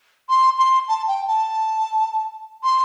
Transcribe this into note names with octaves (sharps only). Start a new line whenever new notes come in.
C6
C6
A5
G5
A5
C6